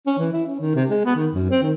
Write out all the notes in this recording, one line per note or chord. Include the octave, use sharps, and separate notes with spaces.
C#4
E3
E4
C#4
D#3
C3
G#3
B3
D#3
F#2
C4
D#3